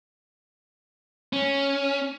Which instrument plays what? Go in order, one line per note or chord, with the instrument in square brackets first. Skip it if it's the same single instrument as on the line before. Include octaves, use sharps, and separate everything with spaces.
[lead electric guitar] C#4